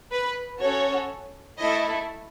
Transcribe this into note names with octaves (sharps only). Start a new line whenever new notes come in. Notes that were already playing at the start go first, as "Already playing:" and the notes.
B4
C#4 F#4 A4 C#5
A3 E4 A4 D#5